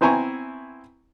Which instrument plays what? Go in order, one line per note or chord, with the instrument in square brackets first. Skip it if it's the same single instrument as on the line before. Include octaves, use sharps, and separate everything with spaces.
[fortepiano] B3 C4 E4 G#5 A#5 C#6